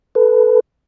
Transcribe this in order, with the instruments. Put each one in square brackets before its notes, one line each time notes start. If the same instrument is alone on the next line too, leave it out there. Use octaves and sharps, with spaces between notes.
[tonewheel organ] A4 B4